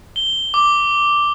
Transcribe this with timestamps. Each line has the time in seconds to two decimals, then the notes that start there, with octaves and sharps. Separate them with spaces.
0.16 G7
0.54 D6